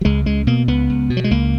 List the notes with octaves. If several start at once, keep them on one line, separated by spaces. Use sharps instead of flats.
F#3
C#2 G#3
C#2 G#3
B2 A#3
C#2 B3
C#2
B2
F#3
G#3
C#2 A#3